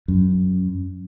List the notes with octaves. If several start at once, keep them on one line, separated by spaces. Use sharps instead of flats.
F#2